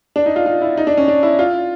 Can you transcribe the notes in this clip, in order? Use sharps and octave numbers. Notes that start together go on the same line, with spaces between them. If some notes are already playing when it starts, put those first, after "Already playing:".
D4
D#4
F4
F4
E4
D#4
D4
C#4
D4
E4
F4